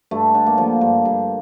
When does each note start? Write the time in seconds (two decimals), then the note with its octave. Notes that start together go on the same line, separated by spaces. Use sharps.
0.11 G2 A3
0.35 D3
0.46 A#3
0.58 F3
0.81 G2
1.05 G2